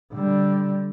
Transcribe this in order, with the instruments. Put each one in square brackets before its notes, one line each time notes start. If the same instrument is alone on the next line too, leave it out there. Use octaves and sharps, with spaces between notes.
[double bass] D3 G3